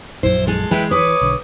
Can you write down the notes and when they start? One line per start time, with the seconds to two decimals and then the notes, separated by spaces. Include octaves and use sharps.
0.23 A#1 F#2 F#3 E4 C5
0.47 G#3 A4
0.71 E3 G#3 E4 B4 G5
0.91 B4 C#5 D6 D#6
1.21 B1 D3